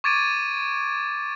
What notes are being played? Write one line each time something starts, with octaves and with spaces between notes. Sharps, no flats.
C#6 D6 G#6 A6 D7 D#7